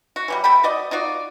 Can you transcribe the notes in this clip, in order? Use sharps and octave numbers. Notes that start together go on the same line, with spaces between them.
F#4
E3 F#3 G3
A3 A4 G5 B5
F#4 D5 D#5
D#4 F4 F#4 D5